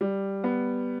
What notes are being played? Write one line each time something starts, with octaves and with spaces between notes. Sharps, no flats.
G3
B3